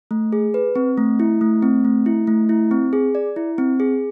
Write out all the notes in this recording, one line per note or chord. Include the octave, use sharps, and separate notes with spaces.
A3
G#4
B4
C4
A3
E4
A3
C4
A3
E4
A3
E4
C4
G#4
D5
E4
C4
G#4